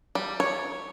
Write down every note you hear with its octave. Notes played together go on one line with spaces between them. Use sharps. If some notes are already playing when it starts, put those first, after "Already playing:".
G3
C#5